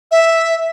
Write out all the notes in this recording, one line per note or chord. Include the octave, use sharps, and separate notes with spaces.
E5